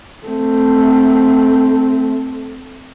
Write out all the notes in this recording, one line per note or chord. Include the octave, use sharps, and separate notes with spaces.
A3 C4